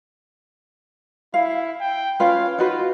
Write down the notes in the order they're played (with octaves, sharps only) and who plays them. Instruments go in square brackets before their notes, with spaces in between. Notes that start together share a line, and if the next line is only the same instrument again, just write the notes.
[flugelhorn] E4 [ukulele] F5
[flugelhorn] G5
[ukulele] C#4 F4 B4 [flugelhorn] F5
[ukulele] D#4 F#4 B4 [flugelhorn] F4